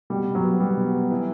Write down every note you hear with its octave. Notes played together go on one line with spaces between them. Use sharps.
B2 G3
B2
F#3
B3
G3 B3
B2
B3
E3